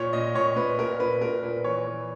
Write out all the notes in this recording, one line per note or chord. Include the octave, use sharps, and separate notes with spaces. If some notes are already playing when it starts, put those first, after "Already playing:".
Already playing: A#2 C#5
A#2 D#5
A#2 C#5
A#2 B4
A#2 A#4
A#2 B4
A#2 A#4
A#2 B4
E3 C#5
E3